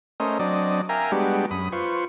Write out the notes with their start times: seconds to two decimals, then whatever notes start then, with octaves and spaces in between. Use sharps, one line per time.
0.20 A3 C#4 A#4 C5 D#5
0.39 F#3 C4 D4 D5 D#5
0.89 A#4 E5 F5 G5 G#5 A#5
1.12 G3 G#3 B3 D4 F#4 G4
1.51 F#2 B5 D#6
1.72 F4 B4 C5 C#6